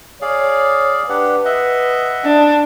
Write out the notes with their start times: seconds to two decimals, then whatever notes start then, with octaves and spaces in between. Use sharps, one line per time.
0.22 G#4 C#5 D5 F5
1.10 D4 G4 B4 F#5
1.45 D#5 E5 F#5
2.24 D4